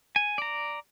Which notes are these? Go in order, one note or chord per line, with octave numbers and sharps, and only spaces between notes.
G#5
D5 A#5